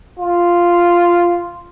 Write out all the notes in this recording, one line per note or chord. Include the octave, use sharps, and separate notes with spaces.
F4